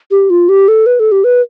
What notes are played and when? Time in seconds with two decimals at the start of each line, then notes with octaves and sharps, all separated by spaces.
0.11 G4
0.30 F4
0.49 G4
0.68 A4
0.86 B4
1.00 A4
1.12 G4
1.24 B4